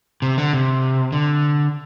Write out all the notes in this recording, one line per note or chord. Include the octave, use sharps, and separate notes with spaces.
C3
D3
C3
D3